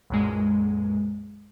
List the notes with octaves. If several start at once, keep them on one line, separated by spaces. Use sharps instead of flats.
B1 F#2 A#2 G#3